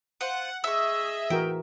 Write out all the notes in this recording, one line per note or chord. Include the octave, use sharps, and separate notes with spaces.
F4 C5 F#5
G#4 D#5 E5 C#6 E6
E3 F#4 A#4 G5